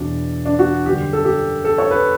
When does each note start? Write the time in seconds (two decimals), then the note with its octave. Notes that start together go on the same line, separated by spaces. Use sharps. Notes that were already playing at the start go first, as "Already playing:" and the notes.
Already playing: E2 B2 F#3 D4
0.45 D4
0.59 F#4
0.86 F#2 D3 G3 G4
1.13 A4
1.25 G4
1.64 A4
1.78 C#5
1.91 B4